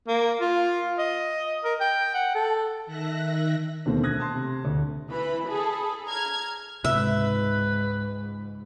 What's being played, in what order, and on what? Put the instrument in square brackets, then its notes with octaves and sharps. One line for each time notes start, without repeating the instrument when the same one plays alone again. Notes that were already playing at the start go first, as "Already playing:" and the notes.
[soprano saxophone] A#3
F4
D#5
A#4
G5
F#5
A4
[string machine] D#3 E5 F#6 A#6
[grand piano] D#2 B2 D3 A3 C4
D#6 F#6 G#6 A#6
A5 C6
C3
D2
[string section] E3 B4 B5
G#4 A4 B5
A#5 F6 G#6
[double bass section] C#2 G#2 [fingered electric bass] C3 [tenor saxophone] B4 [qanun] E5